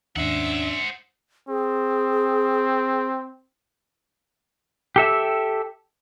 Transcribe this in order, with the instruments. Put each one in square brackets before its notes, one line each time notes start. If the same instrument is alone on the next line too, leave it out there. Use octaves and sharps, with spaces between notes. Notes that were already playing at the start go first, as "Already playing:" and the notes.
[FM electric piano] D#2 G#2 [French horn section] C#4 D4 [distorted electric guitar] C5 F#5 [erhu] E5
[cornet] C4 [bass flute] G#4
[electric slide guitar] G4 A4 E5